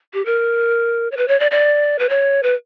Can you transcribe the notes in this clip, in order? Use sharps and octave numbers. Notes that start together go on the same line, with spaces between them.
G4
A#4
C#5
B4
C#5
D5
D5
B4
C#5
B4